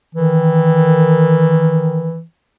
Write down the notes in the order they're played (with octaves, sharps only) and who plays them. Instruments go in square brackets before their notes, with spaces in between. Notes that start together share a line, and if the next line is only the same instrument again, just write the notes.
[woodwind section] D#3 [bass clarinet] E3